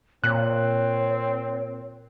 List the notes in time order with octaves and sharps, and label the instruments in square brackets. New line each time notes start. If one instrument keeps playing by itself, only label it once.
[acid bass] A#2 [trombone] C4 [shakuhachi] C#5 [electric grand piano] F#6